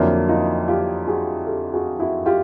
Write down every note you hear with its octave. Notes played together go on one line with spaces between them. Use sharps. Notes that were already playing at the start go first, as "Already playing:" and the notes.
Already playing: F2 D3 F#3 A#3 D4 E4
D#4 F4
F4 G4
F#4 G#4
G4 A4
F#4 G#4
E4 F#4
F4 G4